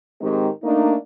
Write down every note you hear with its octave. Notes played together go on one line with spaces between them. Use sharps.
G#2 D#3 G#3 C4 G4
A3 A#3 D4 D#4